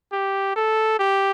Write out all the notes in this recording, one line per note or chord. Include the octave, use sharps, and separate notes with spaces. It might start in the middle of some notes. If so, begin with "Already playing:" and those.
G4
A4
G4